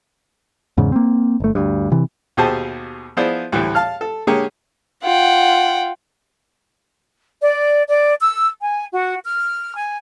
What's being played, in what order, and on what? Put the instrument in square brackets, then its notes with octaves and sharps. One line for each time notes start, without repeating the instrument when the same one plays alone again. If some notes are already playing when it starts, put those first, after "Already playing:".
[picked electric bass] E2 G#2 C#3
A#3 C4
G1 A3
D2 G2
C3 E3
[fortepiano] D#2 B2 G4 G#4 C5 A5
F3 B3 E4 G#4 C5 D5
D2 A2 E3 G3
F5 A5 F6
A4
D3 G#3 A#3 G4 G#4 C#5
[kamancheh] F4 [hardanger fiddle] F#5 G5
[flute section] D5
D5
E6
G#5
F#4
F6
G#5